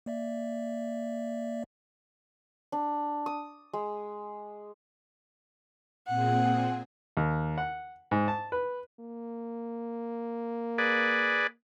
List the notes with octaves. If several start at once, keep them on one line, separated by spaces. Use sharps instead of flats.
A#3 D5 E5
D4
D#6
G#3
A#2 C4 G#4 F#5
D#2
F#5
G#2
A5
B4
A#3
G#4 B4 D5